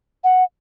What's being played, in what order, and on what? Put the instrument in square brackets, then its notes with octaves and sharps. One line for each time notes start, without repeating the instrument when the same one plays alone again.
[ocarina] F#5